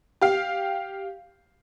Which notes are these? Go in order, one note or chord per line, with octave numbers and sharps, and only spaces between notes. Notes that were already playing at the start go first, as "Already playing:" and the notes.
G4 F5